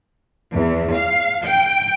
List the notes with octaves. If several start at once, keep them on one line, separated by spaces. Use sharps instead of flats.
E2
F5
G5